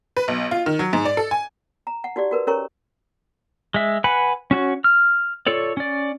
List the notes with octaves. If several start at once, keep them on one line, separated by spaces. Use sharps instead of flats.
B4
B1
F4
D#3
F#3
G#2
D5
A4
G#5
A#5
F#5
D#4 F#4 G4 D5
F#4 A#4 B4
C#4 G#4 A#4 C#5 A#5 C#6
G#3 E5
B4 F#5 G#5 B5
C#4 F#4 C#5
F6
F4 A4 C#5 D5
C#4 D5